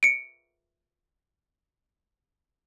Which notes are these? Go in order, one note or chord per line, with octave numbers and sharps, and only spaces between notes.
C#7 D7